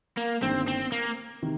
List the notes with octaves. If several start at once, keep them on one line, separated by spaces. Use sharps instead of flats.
A#3
G1 G2 D#3 A#3 C4
C4
A#3
C3 D#3